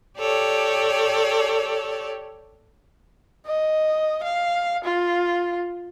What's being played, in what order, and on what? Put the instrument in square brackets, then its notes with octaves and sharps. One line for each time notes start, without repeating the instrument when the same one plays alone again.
[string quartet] G4 A4 C#5 D5
[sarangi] D#5
F5
F4